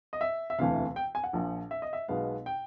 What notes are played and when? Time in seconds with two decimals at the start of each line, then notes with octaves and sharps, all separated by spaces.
0.13 D#5
0.21 E5
0.50 E5
0.59 E1 D2 C3 E3 A3 F5
0.96 G5
1.15 G#5
1.24 F#5
1.33 A#1 A#2 F3
1.71 E5
1.82 D#5
1.93 E5
2.08 B1 B2 G#3 B3 F5
2.46 G5